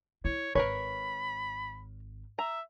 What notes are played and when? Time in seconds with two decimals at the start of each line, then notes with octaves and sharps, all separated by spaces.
0.25 E4 C#5
0.55 G#1 A#4 B4 C#5 B5
2.39 E5 A#5